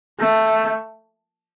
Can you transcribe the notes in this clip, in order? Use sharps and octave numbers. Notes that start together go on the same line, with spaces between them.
A3